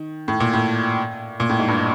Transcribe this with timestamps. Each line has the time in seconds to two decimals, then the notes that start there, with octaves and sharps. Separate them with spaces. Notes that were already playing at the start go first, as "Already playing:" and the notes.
Already playing: D#3
0.28 A2
0.40 A#2
0.53 A2
1.40 A#2
1.50 A2
1.59 G#2
1.68 G2